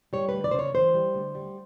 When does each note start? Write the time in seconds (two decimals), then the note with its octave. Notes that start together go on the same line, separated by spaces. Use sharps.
0.13 G3 C#5
0.29 D2 B4
0.44 D5
0.51 C#3 C5
0.59 C#5
0.74 E3 C5
0.94 G3
1.15 D2
1.35 G3